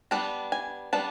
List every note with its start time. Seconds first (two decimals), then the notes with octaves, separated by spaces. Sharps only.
0.11 G3 B3 D4 A5
0.52 G#5
0.93 G3 B3 D4 A5